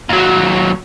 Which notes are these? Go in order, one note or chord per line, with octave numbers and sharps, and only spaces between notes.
D#2 F#3